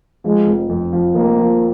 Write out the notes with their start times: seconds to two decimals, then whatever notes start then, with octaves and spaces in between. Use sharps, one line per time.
0.24 F3 G#3
0.47 F1
0.69 F2
0.93 F3
1.15 F1 A#3
1.38 F3